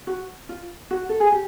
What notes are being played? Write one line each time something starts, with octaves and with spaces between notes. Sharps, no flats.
F#4
F4
F#4
A4
G#4
G4